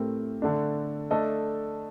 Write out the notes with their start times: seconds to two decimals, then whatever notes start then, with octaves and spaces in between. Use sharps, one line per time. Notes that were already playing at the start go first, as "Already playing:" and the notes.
Already playing: A2 A3 C4 G4 A#4
0.42 D3 A3 D4
1.11 A3 D4 A4 D#5